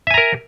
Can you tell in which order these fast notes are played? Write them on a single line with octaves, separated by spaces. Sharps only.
E5 G#5 A#5 A#4